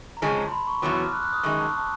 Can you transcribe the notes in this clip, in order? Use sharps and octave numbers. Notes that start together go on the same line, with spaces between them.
A#5
F2 C#3 F3 G#3 C#4 A5
A#5
C6
B5
C#6
E2 B2 F#3 B3 D6
E6
F6
F#6
F#6
D#6
F#2 D#3 G#3 C#6
A5
A5